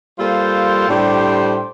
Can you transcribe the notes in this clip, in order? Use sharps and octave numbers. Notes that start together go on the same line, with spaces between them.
G3 A#3 F4 A4 C5
A2 G3 D4 G4 C5